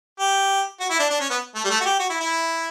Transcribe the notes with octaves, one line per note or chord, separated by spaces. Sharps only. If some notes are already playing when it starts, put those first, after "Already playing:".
G4
F#4
E4
D4
D4
C#4
B3
A3
G3
A3
F#4
G4
F#4
E4
E4